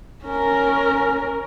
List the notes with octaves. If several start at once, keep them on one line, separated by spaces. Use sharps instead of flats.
C#4 A#4